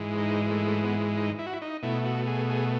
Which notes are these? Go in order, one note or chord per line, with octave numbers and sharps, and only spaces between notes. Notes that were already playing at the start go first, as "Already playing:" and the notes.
Already playing: G#2 E3 G#3
D#4
A3
A3
B3
D#4
E4
F#4
E4
D#4
B2 A3 E4
F#4
G#4
G#4